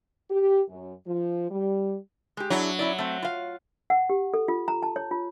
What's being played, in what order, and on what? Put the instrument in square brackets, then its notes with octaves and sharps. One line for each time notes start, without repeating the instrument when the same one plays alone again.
[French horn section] G4
F#2
F3
G3
[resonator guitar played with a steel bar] G#3 G4
[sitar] F#3 [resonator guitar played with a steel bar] D4 E4 G#4
[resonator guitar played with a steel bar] C#4 E4 D5
A3 C4
F4 F5
[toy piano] F#5
G4
A4
F4
A#5
A5
C#5
F4